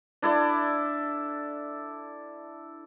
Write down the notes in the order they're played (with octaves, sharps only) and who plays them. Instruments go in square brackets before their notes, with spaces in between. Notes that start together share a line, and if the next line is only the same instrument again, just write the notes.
[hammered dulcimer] D4 E4 A4 D5